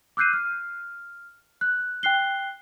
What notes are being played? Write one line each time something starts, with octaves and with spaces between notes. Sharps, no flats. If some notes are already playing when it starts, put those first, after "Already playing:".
D6 E6 F#6 G6 C7 D#7
F6
F#6
G5 F#6 C7 G7